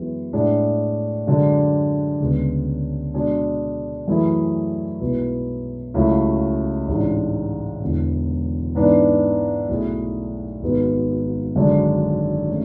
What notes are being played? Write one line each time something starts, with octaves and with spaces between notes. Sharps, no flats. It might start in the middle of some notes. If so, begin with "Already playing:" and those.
Already playing: F#2 E3 G#3 B3 F#4
A2 G#3 D4 G#4
F#2 D3 G#3 D4
D2 C#3 G#3 B3
B2 G#3 D4 G#4
F#2 E3 A3 E4 G#4
B1 B2 G#3 B3 E4
C#2 C#3 F#3 A3 E4
A1 G#2 G#3 D4
E1 E2 D3
G#2 E3 B3 D4
B1 B2 A3 E4 G#4
G#1 G#2 G#3 B3 F#4
G#1 F#2 D3 G#3 D4
A3 C#4